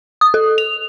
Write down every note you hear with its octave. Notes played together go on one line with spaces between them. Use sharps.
D#6
A4
F7